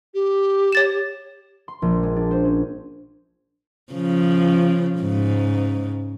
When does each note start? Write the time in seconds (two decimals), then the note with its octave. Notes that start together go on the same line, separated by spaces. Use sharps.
0.14 G4
0.72 C#5 A6 E7
1.68 C6
1.82 A#1
2.03 G#3
2.16 D4
2.31 C5
2.44 C#4
3.93 C#3 F3
4.98 G#2 C#3